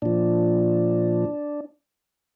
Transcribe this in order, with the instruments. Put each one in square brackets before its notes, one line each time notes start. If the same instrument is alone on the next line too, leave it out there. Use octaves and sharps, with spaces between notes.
[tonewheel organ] A#2 F3 D4